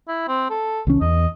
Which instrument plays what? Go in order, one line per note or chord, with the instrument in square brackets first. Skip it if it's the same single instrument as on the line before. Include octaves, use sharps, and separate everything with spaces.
[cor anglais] E4
C4
A4
[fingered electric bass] C2 D#3 C#4
[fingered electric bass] E2 [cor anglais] D#5